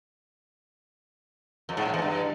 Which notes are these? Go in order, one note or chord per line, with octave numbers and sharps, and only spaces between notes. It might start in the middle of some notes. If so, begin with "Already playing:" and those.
F2
G#2
A2
E2
G2